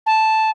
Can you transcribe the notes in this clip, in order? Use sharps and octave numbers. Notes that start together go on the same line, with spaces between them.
A5